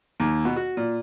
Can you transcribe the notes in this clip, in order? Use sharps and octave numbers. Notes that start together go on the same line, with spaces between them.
D#2
B2
F#4
A#2